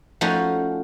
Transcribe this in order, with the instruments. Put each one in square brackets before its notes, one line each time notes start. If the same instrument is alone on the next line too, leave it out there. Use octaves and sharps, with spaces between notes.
[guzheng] F3 A3 C#4 D#4 F#4